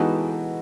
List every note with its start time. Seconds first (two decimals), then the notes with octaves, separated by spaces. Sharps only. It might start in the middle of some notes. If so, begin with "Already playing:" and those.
Already playing: E3 G#3 B3 D#4 F#4 G4 A4